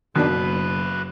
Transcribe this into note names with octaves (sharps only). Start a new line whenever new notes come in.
F#1 F#2 B2 D#3 A#3 D4 B4